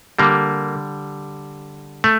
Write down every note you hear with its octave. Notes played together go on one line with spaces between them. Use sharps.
D3 G3 A#3
A3